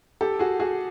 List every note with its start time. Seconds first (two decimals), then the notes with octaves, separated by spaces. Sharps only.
0.21 G4 A4
0.39 F#4 G#4
0.60 F#4 G#4